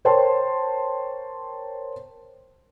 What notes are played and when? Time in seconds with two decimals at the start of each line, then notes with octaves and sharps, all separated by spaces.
0.05 A#4 C5 C#5 G5 A5 C6